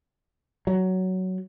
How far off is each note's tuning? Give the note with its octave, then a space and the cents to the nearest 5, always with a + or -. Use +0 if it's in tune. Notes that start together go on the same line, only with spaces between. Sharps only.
F#3 +10